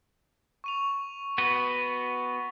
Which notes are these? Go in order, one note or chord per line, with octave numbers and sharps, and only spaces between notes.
C#6 D#7 F7
B3 F#4 B4 G7